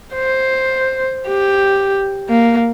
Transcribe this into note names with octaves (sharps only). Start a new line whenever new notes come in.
C5
G4
A#3